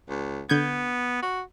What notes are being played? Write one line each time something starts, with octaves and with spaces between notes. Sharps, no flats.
C#2
D3 B3 G6 G#6
F#4